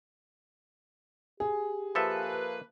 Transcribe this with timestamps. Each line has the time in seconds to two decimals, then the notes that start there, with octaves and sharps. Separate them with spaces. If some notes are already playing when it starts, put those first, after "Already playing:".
1.40 G4 G#4
1.95 F3 A#3 A4 B4 E5